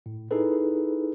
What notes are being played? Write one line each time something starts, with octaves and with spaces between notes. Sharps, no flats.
A2
D#4 E4 G#4 A4 B4